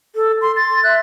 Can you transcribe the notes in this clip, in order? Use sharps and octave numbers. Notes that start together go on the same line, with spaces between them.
A4
C6
C6 A6
E5 F#6